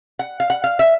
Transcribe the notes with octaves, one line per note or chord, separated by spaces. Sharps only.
F#5
F5
F#5
F5
E5